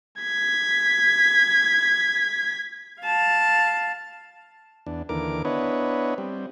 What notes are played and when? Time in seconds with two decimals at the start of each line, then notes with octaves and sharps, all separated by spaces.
0.22 G#6 B6
3.02 F5 A5
4.87 E2 D4
5.09 D#2 D3 E3 A#4 D6
5.45 B3 D4 E4 B4 C#5 D#5
6.18 G3 C4